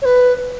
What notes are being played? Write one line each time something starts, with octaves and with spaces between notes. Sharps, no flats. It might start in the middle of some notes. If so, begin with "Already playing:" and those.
C#5
B4